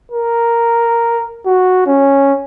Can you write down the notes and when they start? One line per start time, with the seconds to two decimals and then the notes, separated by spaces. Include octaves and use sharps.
0.12 A#4
1.46 F#4
1.87 C#4